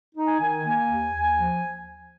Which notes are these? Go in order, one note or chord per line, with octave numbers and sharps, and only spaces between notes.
D#4
G#5
D#3
A#3
D#2
D#2
F3